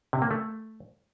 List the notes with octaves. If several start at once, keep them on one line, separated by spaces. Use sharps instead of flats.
C3
A#3
A3